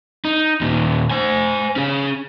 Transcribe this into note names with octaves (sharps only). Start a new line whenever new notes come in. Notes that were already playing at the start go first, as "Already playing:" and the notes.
D#4
D#2 A#2
C5 G#5
C#4 G#4